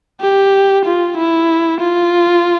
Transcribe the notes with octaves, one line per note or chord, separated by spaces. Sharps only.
G4
F4
E4
F4